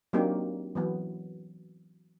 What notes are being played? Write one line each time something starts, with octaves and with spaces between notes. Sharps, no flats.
F#3 A#3 C4 D4 D#4 G4
E3 F#3 B3